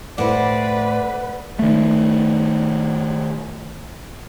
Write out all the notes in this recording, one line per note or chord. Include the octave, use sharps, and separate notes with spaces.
A2 B4 C5 D5 F#5
D#3 A3